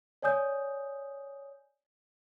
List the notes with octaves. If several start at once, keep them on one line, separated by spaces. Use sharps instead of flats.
C#5 D5 G#5 D#6 G6